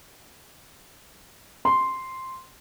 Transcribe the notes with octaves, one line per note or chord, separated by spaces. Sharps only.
C6